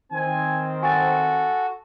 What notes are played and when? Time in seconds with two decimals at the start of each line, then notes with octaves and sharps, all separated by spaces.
0.12 D#3 C4 G#5
0.83 F#4 A4 G#5 A6